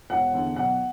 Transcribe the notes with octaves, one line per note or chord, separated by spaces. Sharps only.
E1 F#5
E2 D3
B1 F#5